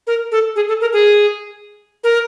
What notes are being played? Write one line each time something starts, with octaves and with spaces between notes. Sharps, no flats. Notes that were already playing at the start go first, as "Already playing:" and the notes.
A#4
A4
G#4
A4
A#4
G#4
A#4